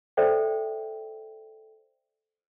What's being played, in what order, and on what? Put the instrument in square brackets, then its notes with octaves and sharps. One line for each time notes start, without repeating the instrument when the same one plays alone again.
[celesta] A4 C5 D5 E5 G5